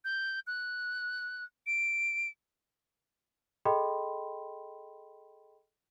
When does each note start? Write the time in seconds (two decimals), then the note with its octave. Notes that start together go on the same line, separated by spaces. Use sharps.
0.04 G6
0.47 F#6
1.66 D7
3.65 G#4 A4 D#5 G5 B5 C6